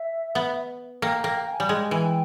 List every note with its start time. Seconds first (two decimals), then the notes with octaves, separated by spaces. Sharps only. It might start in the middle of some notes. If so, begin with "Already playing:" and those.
Already playing: E5
0.35 B3
1.02 A#3 G5
1.19 G5
1.24 A#3
1.36 G5
1.52 G#5
1.60 G3
1.69 G#3 G#5
1.91 E3
2.03 G5